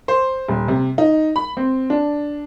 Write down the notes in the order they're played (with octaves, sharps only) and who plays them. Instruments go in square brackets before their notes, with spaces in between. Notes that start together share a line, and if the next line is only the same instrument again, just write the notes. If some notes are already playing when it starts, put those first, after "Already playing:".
[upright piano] C5
D#1
C3
D#4
B5
C4
D4